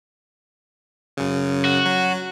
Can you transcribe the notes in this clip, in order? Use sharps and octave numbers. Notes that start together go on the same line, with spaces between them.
F#2 C#3
F#4
F#3